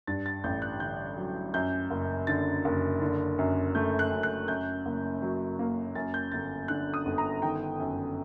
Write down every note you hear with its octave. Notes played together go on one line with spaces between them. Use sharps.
G2 A6
A6
A1 G6
F#6
D3 G6
F#3
F#2 G6
F#1
D3 A6
F#1
D3
F#2
A3 G6
F#6
F#2
F#6
F#2 G6
F#1
F#3
A#3
F#2 A6
G6
G1 A6
D3 F#6
D#6
G1
A#5
D#3 G5
F#2